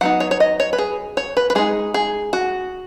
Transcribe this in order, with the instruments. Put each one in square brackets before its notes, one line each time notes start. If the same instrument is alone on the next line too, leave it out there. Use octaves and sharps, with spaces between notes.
[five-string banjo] F#3 B3 D#4 F#5
C#5
C#5
D#5
C#5
B4
G#4
C#5
B4
B4
G#3 D#4 G#4
G#4
F#4